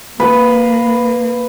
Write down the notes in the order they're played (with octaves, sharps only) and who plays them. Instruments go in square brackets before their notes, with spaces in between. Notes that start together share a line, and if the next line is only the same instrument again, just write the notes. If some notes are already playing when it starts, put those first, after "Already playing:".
[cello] A#3 [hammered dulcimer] B4